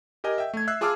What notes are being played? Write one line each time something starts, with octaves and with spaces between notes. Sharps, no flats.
G4 A#4 D#5 G#5
E5 G5
A3 G#6
E5 E6 F#6 C7
F4 G#4 A5 D6 E6 F6